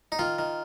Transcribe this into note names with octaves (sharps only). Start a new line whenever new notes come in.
D#4
D#3 F4
D#3